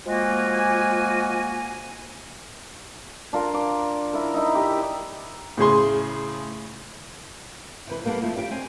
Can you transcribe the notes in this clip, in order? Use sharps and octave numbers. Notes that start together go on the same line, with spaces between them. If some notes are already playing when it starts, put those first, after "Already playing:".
F3 G#3 A#3 F#4 G#5
D4 F4 A#4
D6
E4 A#4
D#4 E4 D#5
G4 A#4
A2 C#3 G#4 C6
C3 E3 B4
G3 A#3 B3 F#4 A4 F#5
F3 A3 E4
D4 G4 F5 G5
C4 D#5 G#5